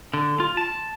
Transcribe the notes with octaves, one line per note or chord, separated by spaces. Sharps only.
D3
F4
A5